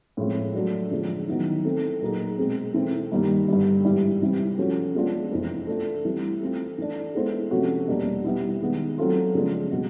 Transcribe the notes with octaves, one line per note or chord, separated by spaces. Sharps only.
A2 F3 G#3 C4 F4
F#3 A3 D4 F#4
D3 F3 G#3
D#3 F#3 B3 E4
A3 C4 E4 A4
A#2 F#3 A#3 D#4 G#4
B2 G#3 C4
E3 A3 C4
G2 D#3 G3 A#3
G2 D3 G3
G#2 E3 G3
C3 E3 G3 C4
F3 A3 C#4 F#4
F3 G#3 B3 D4 F4
F2 C3 E3
A3 D4 F4
E3 G3 C4 E4
A3 C4 F4
E3 A3 D4
G#3 B3 E4 A4 C5
C3 F3 A3 C#4 F#4
E2 B2 G3 A#3 D4
G3 B3 E4
D#3 G#3 B3
F#3 A3 C4 F4 A4
C#3 F3 G#3 B3 D4
B2 G3